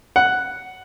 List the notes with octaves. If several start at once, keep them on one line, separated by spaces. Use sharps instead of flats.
F#5